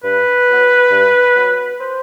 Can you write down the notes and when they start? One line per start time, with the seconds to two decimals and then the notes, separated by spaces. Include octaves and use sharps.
0.04 G2 B4
0.48 F#3 B3
0.91 G2
1.35 F#3 B3
1.79 C5